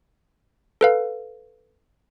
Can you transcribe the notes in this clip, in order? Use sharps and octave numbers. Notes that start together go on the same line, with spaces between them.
A4 B4 F5